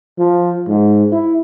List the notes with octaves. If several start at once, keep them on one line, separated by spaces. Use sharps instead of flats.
F3
G#2
E4